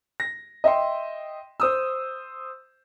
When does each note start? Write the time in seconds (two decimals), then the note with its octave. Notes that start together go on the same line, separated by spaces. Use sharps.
0.20 A#6
0.64 D#5 E5 G5 C6
1.60 C5 D#6 E6